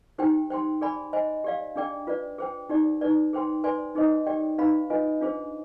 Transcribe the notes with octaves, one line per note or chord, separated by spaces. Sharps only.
D#4 G4 C5 G5
C5 G5 C6
G#4 D5 G#5 B5
C5 D#5 G#5
G4 D5 F5
D4 G#4 D5 G5
F4 B4 D5
G#4 C5 G5
D#4 G4 D5
D#4 B4 D5
G#4 C5 G5 C6
B4 D5 G#5 C6
D#4 G#4 C5 D#5
G4 D5 G5
D#4 G4 B4 F5 B5
F4 B4 D#5 G#5
D4 F4 G#4 C5